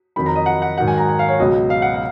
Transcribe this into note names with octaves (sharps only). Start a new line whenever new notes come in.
F2 D#3 F#3 B5
A#5
D#5
F#5
F#5
G#2 D#3 F#3 F#5
G#5
A#5
G#5
F5
C#5
C#2 B2 F#3 D#5
F5
F#5
F5